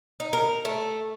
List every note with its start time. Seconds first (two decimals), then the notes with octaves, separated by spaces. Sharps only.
0.20 D#4
0.33 A#4
0.65 A3